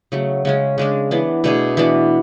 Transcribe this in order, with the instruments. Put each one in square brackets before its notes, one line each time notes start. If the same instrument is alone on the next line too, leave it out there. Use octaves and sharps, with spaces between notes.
[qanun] C#3 F#3 A3
C#3 G#3 C#4
C#3 G#3 D4
E3 B3 D4
B2 A3 D4 G#4
E3 B3 D4 F#4